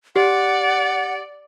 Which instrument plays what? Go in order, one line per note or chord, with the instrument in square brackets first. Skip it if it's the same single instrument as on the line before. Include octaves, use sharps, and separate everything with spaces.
[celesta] G4 [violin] D5 [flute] F#5